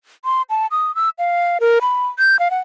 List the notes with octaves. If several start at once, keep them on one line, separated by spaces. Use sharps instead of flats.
C6
A5
D#6
E6
F5
A#4
B5
G6
F5
F#5